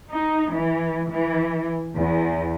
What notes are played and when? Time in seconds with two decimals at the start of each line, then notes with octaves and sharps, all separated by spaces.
0.11 D#4
0.54 E3
1.10 E3
1.98 E2